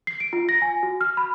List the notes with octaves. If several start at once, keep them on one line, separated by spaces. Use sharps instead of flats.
C7
D7
F4
A#6
G#5
F#4
F6
B5